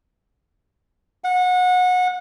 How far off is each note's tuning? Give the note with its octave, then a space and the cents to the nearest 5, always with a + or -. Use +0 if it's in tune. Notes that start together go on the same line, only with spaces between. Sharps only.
F#5 -25